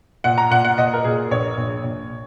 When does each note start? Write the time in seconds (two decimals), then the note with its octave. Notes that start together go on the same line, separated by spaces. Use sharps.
0.24 A#2 F#5
0.38 A#5
0.51 A#2 F#5
0.65 F#5
0.78 A#2 D#5
0.93 A#4
1.05 A#2 G#4
1.31 A#1 C#5
1.58 A#1
1.84 A#1